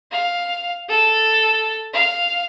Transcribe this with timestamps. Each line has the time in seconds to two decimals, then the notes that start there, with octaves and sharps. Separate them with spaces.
0.11 F5
0.89 A4
1.93 F5